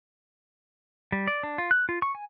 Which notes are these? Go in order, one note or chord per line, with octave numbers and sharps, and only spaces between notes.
G3
D5
D4
F4
F#6
F4
C#6
G#5